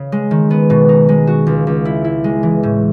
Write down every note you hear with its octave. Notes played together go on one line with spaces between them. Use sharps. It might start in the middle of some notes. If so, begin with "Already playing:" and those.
Already playing: C#3
G#3
D#3
B3
B2
D#4
G#3
F#4
C#2
C#2
E4
E4
G#3
E3
A2